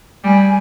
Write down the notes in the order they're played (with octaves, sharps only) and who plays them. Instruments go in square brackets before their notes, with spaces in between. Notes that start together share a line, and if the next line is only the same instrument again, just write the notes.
[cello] G3 [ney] G#5